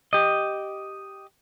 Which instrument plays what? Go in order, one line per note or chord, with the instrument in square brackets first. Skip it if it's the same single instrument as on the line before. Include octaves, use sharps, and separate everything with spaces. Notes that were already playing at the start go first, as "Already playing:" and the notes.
[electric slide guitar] G4 D#5